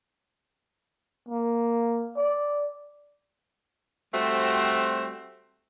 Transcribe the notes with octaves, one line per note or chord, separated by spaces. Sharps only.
A#3
D5
G3 A3 C4 F#4 C5